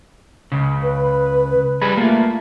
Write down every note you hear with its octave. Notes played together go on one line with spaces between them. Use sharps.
C#2 C#3
B4
G3 G#4 B4
A3 A#3 F4